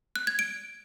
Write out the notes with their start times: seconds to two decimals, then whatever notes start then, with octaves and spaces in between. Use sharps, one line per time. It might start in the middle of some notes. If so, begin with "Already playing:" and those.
0.16 F#6
0.27 G#6
0.39 D7